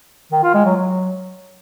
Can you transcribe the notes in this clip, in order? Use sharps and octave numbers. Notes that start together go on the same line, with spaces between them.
D#3
F4
G#3
F#3
F#3